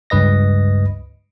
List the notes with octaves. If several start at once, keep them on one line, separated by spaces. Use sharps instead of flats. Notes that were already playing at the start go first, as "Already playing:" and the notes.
C#2 G2 B4 D#5 A#6